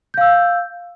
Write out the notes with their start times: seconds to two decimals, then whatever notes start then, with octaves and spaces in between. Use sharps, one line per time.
0.14 G6
0.17 F5
0.21 E6